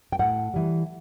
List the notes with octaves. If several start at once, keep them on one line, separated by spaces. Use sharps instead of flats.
G5
A2 F#5
E3 G3